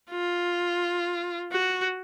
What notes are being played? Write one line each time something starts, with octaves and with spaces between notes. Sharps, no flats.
F4
F#4